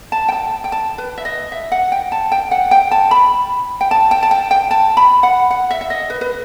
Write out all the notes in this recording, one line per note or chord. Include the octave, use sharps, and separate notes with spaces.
A5
G5
A5
G5
A5
B4
E5
D#5
E5
F#5
G5
A5
G5
F#5
G5
A5
B5
G5
A5
G5
A5
G5
G5
A5
B5
F#5
F#5
E5
E5
D#5
B4
B4